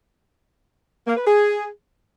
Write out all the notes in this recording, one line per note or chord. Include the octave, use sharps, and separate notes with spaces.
A#3
B4
G#4